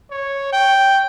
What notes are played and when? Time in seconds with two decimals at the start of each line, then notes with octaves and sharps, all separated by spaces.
0.11 C#5
0.53 G5